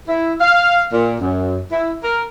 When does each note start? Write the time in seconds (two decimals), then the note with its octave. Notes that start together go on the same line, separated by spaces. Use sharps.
0.09 E4
0.41 F5
0.93 A#2
1.21 F#2
1.72 E4
2.04 A#4